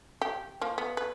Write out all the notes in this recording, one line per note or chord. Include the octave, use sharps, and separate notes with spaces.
G4
F3 A#3
B3
B4